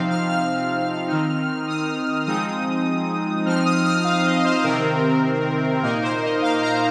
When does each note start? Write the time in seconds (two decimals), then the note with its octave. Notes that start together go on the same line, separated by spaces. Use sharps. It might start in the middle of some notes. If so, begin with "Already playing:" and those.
Already playing: C3 F3 C4 D#4 F5
0.09 F6
0.29 F6
1.08 D#3 C4 D#4
1.67 D#6
2.26 F3 G#3 C4 D#4 D#6
3.45 F3 C4 D#4 F6
3.65 D#6
3.85 F6
4.04 F5
4.25 D#5
4.44 C5
4.64 C3 D#3 C4 A#4
5.82 A#2 A#3 D#4 A#4
6.03 C5
6.22 D#5
6.42 F5
6.62 A#5